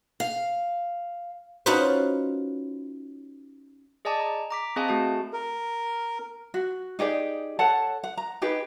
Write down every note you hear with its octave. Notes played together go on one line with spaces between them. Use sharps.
F5
C#4 D#4 F4 F#4 B4 C5
G#4 D5 D#5 G#5 A5 D6
A#5
A#5 D6 B6
C4 G#4 D#5 F5 G#5 A5
A3 F#4 G#4 A5
A#4
F#4
D#4 G4 G#4 D5
A4 C#5 F#5 A5
F#5
A#5
D#4 G4 G#4 B4